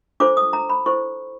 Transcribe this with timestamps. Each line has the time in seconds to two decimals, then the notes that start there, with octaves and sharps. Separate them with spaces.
0.20 D4 F4 A4 C5 D6
0.37 D#6
0.53 A#5
0.69 B5
0.86 E4 A4 C5 C#6